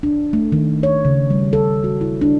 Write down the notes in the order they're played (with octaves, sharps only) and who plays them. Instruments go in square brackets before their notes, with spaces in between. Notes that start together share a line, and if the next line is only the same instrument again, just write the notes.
[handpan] D4
A3
D#3
C#5
C#3
G3
A4
F#4
E4
D4